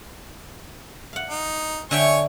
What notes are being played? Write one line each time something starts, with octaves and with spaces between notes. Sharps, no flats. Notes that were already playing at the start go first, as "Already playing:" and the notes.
F5 F#5
D#4
D3 C#5 E5 G5 G#5 C#6